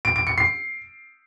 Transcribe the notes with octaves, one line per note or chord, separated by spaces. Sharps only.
D7
D7
C#7
C7